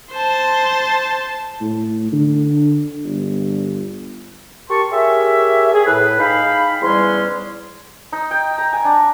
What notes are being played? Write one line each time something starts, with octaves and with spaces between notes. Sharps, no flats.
C5 A5
A2
D3
G1
G4 A#4 A5 C6 C#6
G4 G#4 A#4 C#5 E5
G#4
A2 B4
D#4 G#4 F5 G5 B5
E2 G#2 G3 G#3 C#4 C6
D#4
G5
A#5
G#5
D4